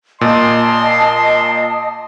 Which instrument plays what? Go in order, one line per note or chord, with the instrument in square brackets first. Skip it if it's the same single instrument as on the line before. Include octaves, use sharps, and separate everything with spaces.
[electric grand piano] A#2 [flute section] D#5 A5 D#6 [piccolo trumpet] C6